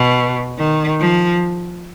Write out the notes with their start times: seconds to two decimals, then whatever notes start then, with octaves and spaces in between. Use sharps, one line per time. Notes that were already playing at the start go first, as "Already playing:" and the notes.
Already playing: B2
0.58 D#3
1.00 F3